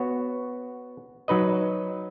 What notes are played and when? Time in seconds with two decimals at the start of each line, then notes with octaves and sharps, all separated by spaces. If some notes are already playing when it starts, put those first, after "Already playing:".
Already playing: B3 F#4 C#5
1.28 F#3 D#4 B4 D#5